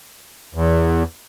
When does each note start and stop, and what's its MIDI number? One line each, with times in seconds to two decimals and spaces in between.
0.54 1.03 40